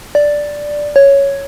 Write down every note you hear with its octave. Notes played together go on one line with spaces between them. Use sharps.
D5
C#5